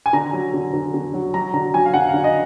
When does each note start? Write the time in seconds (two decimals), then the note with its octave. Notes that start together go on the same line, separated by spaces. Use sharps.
0.06 G#5
0.13 D3 A#5
0.33 F#3
0.54 D3
0.74 D3
0.94 D3
1.14 F#3
1.34 F#3 A#5
1.54 D3 A#5
1.74 F#3 G#5
1.86 F5
1.94 D3 F#5
2.09 D3 F5
2.24 D#5